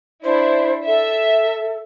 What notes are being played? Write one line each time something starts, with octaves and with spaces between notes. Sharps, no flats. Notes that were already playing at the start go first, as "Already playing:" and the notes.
D4 E4 C5
A4 E5